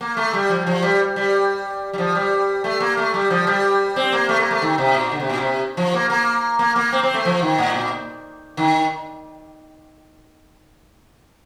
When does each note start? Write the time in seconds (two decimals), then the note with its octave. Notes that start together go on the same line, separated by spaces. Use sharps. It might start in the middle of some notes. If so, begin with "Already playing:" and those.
0.01 A#3
0.17 A3
0.34 G3
0.49 F3
0.67 F3
0.83 G3
1.16 G3
1.93 G3
1.98 F3
2.15 G3
2.64 A3
2.80 A#3
2.97 A3
3.14 G3
3.30 F3
3.47 G3
3.96 C4
4.12 A#3
4.29 A3
4.40 A#3
4.51 A3
4.62 D#3
4.78 C3
4.94 A#2
5.12 D3
5.19 C3
5.29 A#2
5.38 C3
5.77 F3
5.94 A#3
6.10 A#3
6.59 A#3
6.76 A#3
6.93 C4
7.03 C4
7.14 A3
7.25 F3
7.42 D#3
7.58 A2
7.74 A#2
8.57 D#3